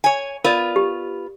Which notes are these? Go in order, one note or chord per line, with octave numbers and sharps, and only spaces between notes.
C#5 G#5
B3 F4 A#4 D5
G4